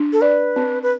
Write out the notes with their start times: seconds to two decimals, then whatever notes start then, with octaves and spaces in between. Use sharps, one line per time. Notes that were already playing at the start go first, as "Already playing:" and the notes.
Already playing: D4
0.13 A4
0.21 B4 D5
0.56 C4
0.83 B4